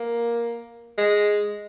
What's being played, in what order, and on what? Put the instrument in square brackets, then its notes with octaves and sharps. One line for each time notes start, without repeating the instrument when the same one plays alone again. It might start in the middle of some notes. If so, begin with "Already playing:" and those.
Already playing: [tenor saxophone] A#3
G#3